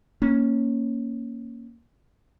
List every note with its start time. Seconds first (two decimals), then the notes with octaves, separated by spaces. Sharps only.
0.22 A#3 C#4